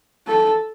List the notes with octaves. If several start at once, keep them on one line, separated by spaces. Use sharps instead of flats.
A4